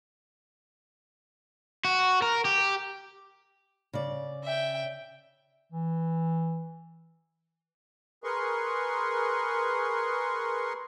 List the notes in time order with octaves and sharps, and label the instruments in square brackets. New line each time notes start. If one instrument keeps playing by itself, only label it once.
[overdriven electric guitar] F#4
A#4
G4
[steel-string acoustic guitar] C#3 D5
[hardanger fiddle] E5 G5
[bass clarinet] E3
[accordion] G#4 A#4 B4 C6 C#6